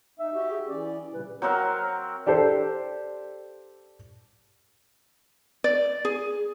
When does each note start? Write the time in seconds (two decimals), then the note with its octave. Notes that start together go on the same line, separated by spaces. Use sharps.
0.19 D#4 E5
0.33 F#4 G4
0.51 G#4
0.69 E3 C#4 D5
1.14 A#2 C#3 G3 B4
1.42 F#3 C4 A#4 F#5
2.26 D4 G4 A4 C5
5.64 D5
6.05 G#4